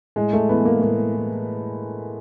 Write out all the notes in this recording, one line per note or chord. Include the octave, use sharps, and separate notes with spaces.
A2 G#3
A3
E3 B3
A#3
A2 A#3
E3